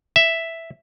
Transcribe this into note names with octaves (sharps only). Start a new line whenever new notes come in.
E5